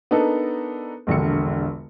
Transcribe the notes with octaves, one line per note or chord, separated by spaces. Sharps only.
B3 D4 D#4 A4 A#4
E1 A#1 D3 C#7